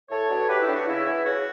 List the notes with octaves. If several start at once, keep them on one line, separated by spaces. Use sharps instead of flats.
A2 A4 C#5
F#3 B3 D4
A2 G4 B4
E4 G4
F#3 B3 D4
F#4
C#3 E4
E3 B3
C#3 F#4